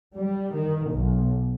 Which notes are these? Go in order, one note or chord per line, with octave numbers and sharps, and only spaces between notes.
G3
D#3
B1